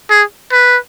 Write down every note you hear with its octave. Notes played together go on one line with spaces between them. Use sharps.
G#4
B4